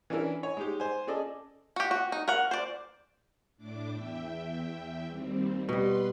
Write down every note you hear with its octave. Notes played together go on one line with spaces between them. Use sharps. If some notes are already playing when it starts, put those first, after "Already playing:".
E3 C#4 D4 E4 A#4
C#5 G#5
G#3 D#4 G4
C5 G#5
C#4 G#4 A4 D5 D#5
F#4 G4
F#4
D#4
A#4 F#5
C5 D5
A2 D4 D6
E2 E5 G5
D#2 G3 C4
B2 G3 B4 C6